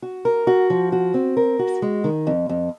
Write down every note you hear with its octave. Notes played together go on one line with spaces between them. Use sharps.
F#4
A#4
F#4
F3
F#4
C4
A#4
F#4
G#3
D#3
F2
F2